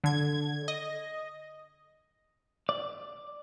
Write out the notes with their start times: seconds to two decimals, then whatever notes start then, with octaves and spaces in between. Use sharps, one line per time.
0.04 D3 G#6
0.68 D#5
2.69 D5